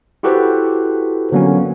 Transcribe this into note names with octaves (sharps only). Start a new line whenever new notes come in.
E4 F#4 G4 A4 B4 C5
D3 F#3 A#3 B3 C#4